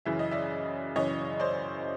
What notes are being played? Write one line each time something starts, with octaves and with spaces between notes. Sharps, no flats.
F#2 C#3 E3 E5
D#5
D5 E5
F#2 C#3 E3 C#5 D#5
C5 D5